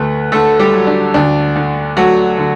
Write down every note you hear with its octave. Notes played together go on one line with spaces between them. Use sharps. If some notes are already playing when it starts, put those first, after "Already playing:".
Already playing: D2 A3 B4
D3 A3 A4
G3 G4
F#3
D4
D2 D4
D3
F#3 A3 F#4
D3